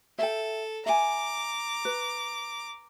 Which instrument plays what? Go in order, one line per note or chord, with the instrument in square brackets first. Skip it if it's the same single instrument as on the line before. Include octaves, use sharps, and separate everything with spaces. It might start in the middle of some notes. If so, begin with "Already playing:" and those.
[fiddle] A4 [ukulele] E5 G5
[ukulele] E5 G#5 [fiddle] A#5 D6
[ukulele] B4